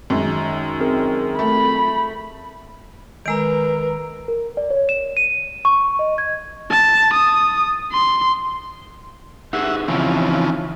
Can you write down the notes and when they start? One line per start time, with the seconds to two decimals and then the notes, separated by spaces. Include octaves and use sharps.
0.10 F#2 D#3 G#3
0.80 C4 G#4 A#4
1.39 A3 B5
3.26 D#3 G#3 A#4 B4 A#5 E6 D7
4.28 A#4
4.57 D5
4.70 C#5
4.89 E7
5.17 D#7
5.65 C#6
5.99 D#5
6.18 G#6
6.71 A5
7.14 D#6
7.92 C6
9.53 D#4 G4 G#4 E5 F#5
9.88 C#3 E3 F3 C4 D#4 E4